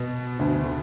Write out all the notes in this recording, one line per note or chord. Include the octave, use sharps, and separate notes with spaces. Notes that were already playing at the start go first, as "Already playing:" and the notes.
Already playing: B2 B3
D2 D3
D3